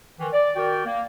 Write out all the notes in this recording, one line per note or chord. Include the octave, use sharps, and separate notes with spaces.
D#3 E3
D5
D#3 F#4 A#4 D5 G5
A#3